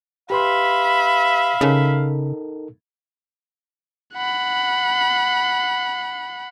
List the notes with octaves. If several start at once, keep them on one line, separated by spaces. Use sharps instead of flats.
G4 B4 E5 F5 B5 C6
C#3 D#4 A4 A#4
F#5 B5